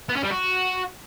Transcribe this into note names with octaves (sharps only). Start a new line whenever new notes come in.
B3
C#4
G3
F#4